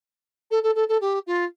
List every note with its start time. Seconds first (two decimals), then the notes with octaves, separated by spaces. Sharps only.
0.51 A4
0.63 A4
0.75 A4
0.89 A4
1.01 G4
1.27 F4